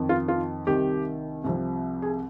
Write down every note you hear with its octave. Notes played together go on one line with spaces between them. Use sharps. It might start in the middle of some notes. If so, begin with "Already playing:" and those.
Already playing: F2 D#3
F4
F4
C2 C3 D#3 G4
C2 C3 F3
G#4